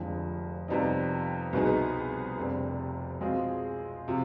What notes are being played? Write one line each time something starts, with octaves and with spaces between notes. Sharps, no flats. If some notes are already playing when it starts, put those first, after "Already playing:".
Already playing: F1 F2 D3 F3 G#3
F2 C3 G3 B3 D#4
C2 B2 B3 D#4 G#4
F1 F2 C3 G3 D4
B2 G#3 C4 F4 G#4
C3 F3